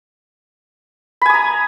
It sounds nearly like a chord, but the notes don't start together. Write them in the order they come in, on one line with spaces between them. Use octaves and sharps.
B5 G#5 D#6 A#5